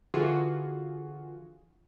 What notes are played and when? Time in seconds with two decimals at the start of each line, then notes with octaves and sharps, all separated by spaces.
0.14 D3 E3 F4 F#4 G#4